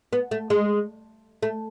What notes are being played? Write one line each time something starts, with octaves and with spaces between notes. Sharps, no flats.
B3
A3
G#3
A3